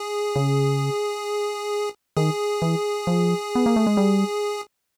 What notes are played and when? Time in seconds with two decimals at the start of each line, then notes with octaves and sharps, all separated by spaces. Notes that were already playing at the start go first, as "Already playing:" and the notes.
Already playing: G#4
0.36 C#3
2.17 D#3 G#4
2.62 E3
3.07 F3
3.55 B3
3.66 A#3
3.76 A3
3.87 G#3
3.97 G3